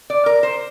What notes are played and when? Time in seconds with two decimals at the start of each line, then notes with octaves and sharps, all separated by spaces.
0.10 D5
0.26 A#4
0.43 C5